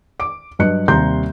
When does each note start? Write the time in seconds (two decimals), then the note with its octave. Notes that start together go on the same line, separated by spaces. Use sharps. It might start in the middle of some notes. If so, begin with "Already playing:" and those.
0.20 D6 D7
0.59 G2 F#3 D#5 F#6 C#7
0.88 D#2 C3 G3 A#5 C6 G6